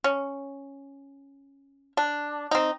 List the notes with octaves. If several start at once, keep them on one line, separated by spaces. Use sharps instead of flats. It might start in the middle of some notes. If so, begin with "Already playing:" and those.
C#4
D4
C4 D#4